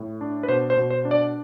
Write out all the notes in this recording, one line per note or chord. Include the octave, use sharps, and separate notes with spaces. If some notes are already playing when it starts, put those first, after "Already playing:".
Already playing: A2
D4
B4
B2 C5
C5
B2
C5
D4
D5